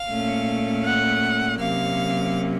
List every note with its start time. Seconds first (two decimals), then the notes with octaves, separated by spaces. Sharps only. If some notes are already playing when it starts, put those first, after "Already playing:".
Already playing: F5
0.09 A#2 A3 C#4
0.84 F#5
1.59 C3 F#3 A#3 C#4 F5